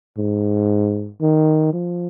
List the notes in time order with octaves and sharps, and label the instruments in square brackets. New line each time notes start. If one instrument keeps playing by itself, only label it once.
[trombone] G#2
D#3
F3